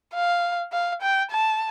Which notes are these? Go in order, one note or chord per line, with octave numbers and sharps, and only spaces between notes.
F5
F5
G5
A5